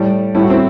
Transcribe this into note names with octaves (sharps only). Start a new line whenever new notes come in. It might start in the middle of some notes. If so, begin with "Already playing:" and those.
Already playing: A2 G3 D5
A2 G3 E4
F#4
C4 E4